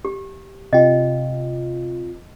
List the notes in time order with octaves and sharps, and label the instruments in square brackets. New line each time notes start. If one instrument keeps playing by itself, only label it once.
[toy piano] G4
[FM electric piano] C3 F4 [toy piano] D#5 G5